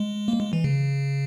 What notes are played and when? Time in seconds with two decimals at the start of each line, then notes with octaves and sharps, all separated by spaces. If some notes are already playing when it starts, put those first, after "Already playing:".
Already playing: G#3
0.28 A#3
0.40 G#3
0.53 E3
0.64 C#3